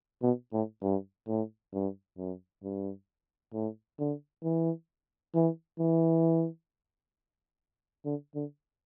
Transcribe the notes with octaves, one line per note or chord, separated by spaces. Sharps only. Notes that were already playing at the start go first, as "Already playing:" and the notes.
B2
A2
G2
A2
G2
F#2
G2
A2
D3
E3
E3
E3
D3
D3